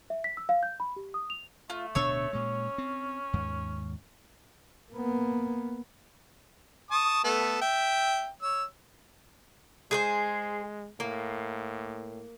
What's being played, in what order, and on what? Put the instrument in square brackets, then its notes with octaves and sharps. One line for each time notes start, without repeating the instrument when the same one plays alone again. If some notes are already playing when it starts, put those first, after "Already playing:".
[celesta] E5
B6
E6
F5
G6
B5
G4
D#6
F7
[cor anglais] A3 [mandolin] F4
[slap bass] D1 B2 D4 [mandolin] C#5 C#6 E6
[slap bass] A#2 G#3 [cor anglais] C#4
[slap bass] C4
D#2 G#2
[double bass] A#3 B3
[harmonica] A5 C#6 D#6
A3 B3 A4
E5 G5
C#5 E6
[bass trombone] G#3 [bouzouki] G#4 B4 C5
[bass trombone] A2 [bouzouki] A#3